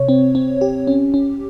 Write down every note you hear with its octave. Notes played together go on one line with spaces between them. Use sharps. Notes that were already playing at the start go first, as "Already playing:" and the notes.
Already playing: C3 C#5
C4
C4
G4
C#4
C#4